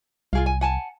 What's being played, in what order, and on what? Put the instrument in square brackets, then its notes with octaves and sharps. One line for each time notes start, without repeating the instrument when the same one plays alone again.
[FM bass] C2 [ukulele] F4 G#4 F5
[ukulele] G#5
F#5 G#5 A5